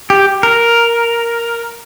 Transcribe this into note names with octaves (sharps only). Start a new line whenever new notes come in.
G4
A#4